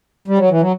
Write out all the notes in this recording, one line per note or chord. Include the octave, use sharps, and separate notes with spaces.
G3
F#3
E3
F#3